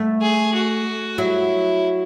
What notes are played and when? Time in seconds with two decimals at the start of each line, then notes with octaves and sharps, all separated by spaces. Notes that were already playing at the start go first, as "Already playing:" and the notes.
Already playing: A3
0.22 G#4
0.55 F#4
1.18 F#3 E4